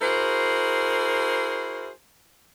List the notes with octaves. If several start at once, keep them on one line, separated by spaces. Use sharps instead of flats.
E4 F#4 G#4 A#4 C5